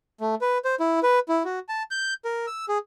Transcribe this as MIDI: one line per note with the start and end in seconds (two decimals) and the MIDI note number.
0.21 0.35 57
0.41 0.58 71
0.65 0.75 72
0.80 1.00 64
1.03 1.19 71
1.29 1.43 64
1.45 1.59 66
1.69 1.83 81
1.91 2.14 91
2.25 2.46 70
2.47 2.65 88
2.69 2.78 68